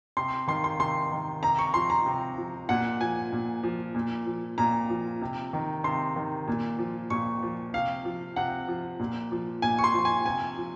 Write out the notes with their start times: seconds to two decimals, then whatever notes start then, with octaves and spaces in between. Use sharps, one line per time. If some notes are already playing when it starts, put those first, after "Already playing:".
0.17 C3 C6
0.47 D#3 C6
0.64 C6
0.79 C3 C6
1.11 D#3
1.43 C3 A#5
1.59 C#6
1.74 F3 C6
1.90 A#5
2.06 C3
2.38 F3
2.69 A#2 F#5
3.01 F3 G#5
3.32 A#2
3.63 F3
3.95 A#2
4.26 F3
4.58 A#2 A#5
4.90 F3
5.21 C3
5.53 D#3
5.84 C3 C6
6.16 D#3
6.48 A#2
6.79 F3
7.10 A#2 C#6
7.43 F3
7.74 C3 F5
8.05 F3
8.36 C3 F#5
8.68 F3
9.00 A#2
9.32 F3
9.62 A#2 G#5
9.79 C#6
9.84 C6
9.94 F3
10.05 G#5
10.26 C3 G#5
10.58 F3